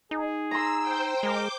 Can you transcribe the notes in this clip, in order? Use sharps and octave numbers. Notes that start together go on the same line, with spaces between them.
D#4 G#4
A#5 C6 E6
C5 G5
G#3 A#4 D6 G6